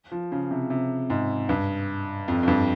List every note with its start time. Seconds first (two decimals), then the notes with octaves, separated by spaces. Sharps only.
0.12 F3
0.32 C#3
0.51 C3
0.70 C3
1.10 G#2
1.49 G2
2.28 F2
2.43 F2
2.48 G2